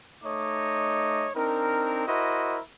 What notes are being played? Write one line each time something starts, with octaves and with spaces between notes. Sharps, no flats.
A3 D#4 C#5 D#5 D6
C4 D4 D#4 A#4
E4 F#4 A#4 C5 D#5